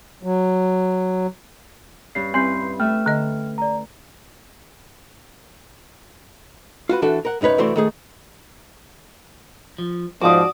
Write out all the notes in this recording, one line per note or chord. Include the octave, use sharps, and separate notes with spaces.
F#3
G2 C#4 C7
G3 C4 E4 B4 C6 G6 C7
A3 E5 G5 F6
D3 D#5
D5 A#5
F4 F#4 B4
E3 D4 F#4 A4 E5
A#4 F#5
C2 F#2 D#4 B4 C#5
C2 E3 A3 F#4 D5 C6
D#3 A3 G#4
F3
G#2 F3 F#4 D5 D6 D#6